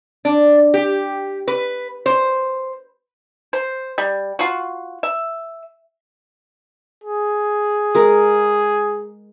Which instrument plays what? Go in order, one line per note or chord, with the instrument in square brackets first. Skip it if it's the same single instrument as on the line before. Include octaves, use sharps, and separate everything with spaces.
[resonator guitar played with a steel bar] D4
G4
B4
C5
[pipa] C5
G3
F4 F#4
E5
[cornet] G#4
[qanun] G#3 A#4